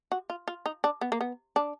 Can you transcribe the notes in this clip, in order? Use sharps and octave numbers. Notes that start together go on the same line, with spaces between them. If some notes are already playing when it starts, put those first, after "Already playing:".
F#4
F4
F4
D#4
D4
B3
A#3
B3
D4